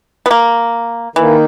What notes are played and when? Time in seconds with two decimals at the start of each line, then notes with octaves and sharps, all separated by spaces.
0.26 B3
0.31 A#3
1.16 D#3 E3 A#3 D#4